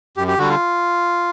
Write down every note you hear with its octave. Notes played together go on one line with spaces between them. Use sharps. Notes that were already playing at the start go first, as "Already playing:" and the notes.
F#2 G4
G4
D3 G3 F#4
F4